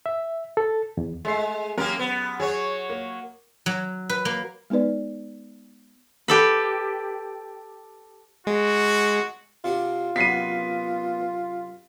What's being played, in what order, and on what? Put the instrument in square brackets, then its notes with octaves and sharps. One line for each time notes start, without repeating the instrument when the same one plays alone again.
[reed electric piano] E5
A4
E2
[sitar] G#3 [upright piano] A3 E5 C7
[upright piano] F#2 [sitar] A#3 G4 A#4
[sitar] B3
[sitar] F#3 C#5 [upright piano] G#4
[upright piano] A#3
[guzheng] F#3
B4
A#3
[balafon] G#3 B3 D#4 B4 D5
[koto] G4 A4 B4
[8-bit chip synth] G#3 [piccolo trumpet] F#4
[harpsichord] C3 D4 F#4 [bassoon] F4
[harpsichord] F#2 C3 [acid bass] B3 [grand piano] B6 C7 D#7